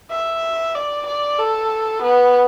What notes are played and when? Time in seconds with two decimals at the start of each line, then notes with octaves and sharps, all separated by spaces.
0.10 E5
0.74 D5
1.07 D5
1.38 A4
2.03 B3